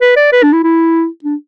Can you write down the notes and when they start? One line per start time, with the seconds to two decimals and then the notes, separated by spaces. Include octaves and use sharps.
0.01 B4
0.16 D5
0.32 B4
0.43 D4
0.53 E4
0.63 E4
1.24 D4